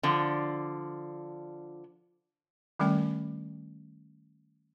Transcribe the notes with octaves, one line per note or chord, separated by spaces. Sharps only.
D3 F3
D#3 G3 A3 C#4 G5